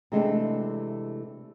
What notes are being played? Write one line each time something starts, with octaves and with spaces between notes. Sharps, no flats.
C3 E3 G#3 A3 C4 D4